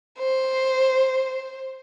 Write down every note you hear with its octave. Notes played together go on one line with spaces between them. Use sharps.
C5